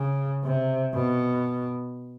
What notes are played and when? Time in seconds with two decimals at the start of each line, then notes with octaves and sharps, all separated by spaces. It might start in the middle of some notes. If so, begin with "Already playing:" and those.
Already playing: C#3
0.44 C3
0.94 B2